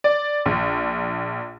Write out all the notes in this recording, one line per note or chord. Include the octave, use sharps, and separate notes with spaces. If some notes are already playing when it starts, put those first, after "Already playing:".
D5
A#1